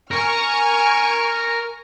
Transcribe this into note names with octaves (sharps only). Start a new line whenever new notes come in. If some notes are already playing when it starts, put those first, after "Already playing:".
A#4 G#5 C#6 F6